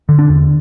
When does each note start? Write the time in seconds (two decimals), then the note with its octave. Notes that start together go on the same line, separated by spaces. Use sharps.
0.09 D3
0.19 D4
0.29 E2